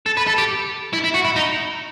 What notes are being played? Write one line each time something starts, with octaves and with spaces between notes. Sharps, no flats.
A4
B4
A4
G4
E4
E4
F#4
E4
D#4